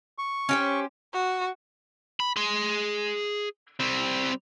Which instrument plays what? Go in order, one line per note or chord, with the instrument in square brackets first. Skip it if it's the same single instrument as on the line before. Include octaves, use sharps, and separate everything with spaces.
[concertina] C#6
[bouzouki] C#4 G4 C5
[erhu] F#4
[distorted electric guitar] B5
G#4 C6
G3 C4